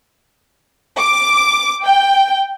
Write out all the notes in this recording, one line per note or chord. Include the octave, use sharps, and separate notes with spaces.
D6
G5